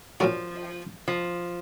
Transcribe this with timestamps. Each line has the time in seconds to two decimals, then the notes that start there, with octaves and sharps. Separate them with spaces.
0.20 A#2 F3 F#3 A#3 D4 F#4
1.08 F3